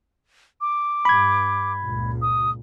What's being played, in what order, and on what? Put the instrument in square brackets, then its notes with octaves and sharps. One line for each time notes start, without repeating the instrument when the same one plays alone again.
[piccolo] D6
[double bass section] G2 [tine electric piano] B5 G#6
[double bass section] C#2 A#2
[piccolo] D#6